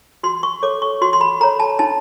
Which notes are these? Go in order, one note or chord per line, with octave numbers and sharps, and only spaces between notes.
F#4 C6
C#6
A4 C#5 D6
C#6
F#4 C6
C6
B5
A4 C#5 A#5
A5
D#4 A5